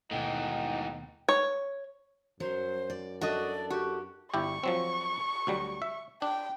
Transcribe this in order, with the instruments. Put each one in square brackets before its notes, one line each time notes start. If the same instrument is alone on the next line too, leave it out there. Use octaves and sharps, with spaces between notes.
[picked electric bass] D#2 B2 A3 [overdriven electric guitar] G#2 E3 [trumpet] D#4 [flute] G5
[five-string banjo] C#5
[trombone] F#2 [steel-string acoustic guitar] F#3 [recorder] C5
[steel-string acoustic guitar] D5
[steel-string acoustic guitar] D4 E4 A4 [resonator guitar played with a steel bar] F#4 D#5 [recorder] D5
[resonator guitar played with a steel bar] F#4 [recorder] G4
[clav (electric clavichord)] G1 E4 G4 [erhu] C#6
[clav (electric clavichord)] F3 F#3 C4
D2 F#3 G3
E5
[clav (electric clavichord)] D4 [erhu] G5